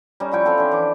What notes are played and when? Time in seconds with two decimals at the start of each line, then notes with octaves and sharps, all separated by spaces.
0.20 G3 C#4 D#4
0.32 F3 E4 G5 C#6
0.45 C4 A4 F5 G5
0.58 C#4 D4
0.71 E3 D6